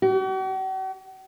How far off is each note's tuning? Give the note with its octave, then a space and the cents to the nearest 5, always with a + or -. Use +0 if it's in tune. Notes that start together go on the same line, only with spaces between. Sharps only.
F#4 +45